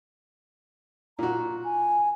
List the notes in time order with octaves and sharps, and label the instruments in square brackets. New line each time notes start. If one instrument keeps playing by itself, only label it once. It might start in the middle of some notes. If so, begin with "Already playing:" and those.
[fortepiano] A#2 F#4 [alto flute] A#5
[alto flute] G#5